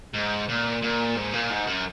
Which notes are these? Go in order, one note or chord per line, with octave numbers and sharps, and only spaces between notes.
G#2
A#2
A#2
G#2
A#2
G#2
F#2